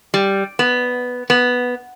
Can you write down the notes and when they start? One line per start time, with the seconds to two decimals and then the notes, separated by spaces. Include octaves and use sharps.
0.14 G3
0.59 B3
1.30 B3